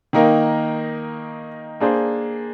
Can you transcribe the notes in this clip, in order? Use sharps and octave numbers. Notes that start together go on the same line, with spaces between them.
D#3 A#3 D#4 A#4
A#3 D4 G#4 C5